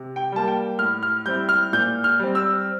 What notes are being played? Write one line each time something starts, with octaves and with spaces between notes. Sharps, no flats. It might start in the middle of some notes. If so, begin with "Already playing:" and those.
Already playing: C3
G5
G3 A#3 A5
G5
A2 F6
F6
G3 C4 E4 G6
F6
A#2 G6
F6
G3 C4
E6